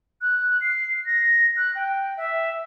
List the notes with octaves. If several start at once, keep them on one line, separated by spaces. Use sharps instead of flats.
F#6
C7
A#6
F#6
G5
E5